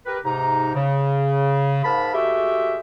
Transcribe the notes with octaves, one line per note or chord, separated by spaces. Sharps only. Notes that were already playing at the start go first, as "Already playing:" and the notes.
G4 A#4 B4
G#2 C3 D#4 A#5
C#3
G#2 A#3 F5 A5 B5
G#3 A3 F#4 G4 E5